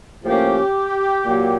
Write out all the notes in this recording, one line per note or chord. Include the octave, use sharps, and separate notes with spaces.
A2 F3 A#3 C#4 G4
A#2 F#3 A#3